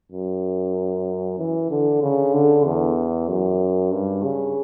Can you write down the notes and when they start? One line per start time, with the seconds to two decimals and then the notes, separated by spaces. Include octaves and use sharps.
0.12 F#2
1.39 E3
1.70 D3
2.02 C#3
2.34 D3
2.65 E2
3.28 F#2
3.92 G2
4.23 C#3